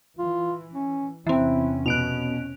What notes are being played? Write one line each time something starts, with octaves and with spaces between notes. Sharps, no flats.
E3 F4
C#4
E2 C3 E3 C4 C#4 E4 E5 G5
B2 B3 F#6 D7 F7